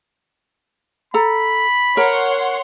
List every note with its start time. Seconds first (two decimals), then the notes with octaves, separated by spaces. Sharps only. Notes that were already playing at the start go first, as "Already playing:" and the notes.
1.14 A4 A#5 B5
1.97 A#4 C#5 F#5 C6